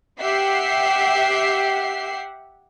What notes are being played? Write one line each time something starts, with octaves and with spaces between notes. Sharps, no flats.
G4 E5 F#5 C7